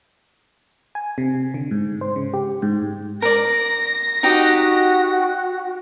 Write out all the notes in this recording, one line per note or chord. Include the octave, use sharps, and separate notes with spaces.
G#5
C3
D3
G#2
C5
C#3
G4
G#2
A#4 D5 A#6
D#4 F#4 G4 D#5